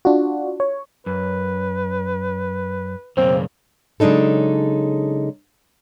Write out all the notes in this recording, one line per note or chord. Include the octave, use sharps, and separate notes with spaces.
D4 F4 F#4
C#5
F#2 B4
B1 F#2 C#3 A#3 C4
C#3 F#3 G#3 D4 D#4 A4